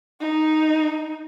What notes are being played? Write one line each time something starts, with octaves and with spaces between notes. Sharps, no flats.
D#4